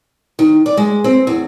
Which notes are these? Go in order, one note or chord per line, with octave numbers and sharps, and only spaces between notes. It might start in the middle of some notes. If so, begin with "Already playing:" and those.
D#3
D5
G#3
C4
E2